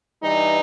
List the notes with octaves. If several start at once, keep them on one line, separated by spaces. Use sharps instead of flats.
G2 E3 G3 D#4